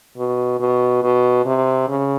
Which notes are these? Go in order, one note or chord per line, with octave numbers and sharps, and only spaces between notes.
B2
B2
B2
C3
C#3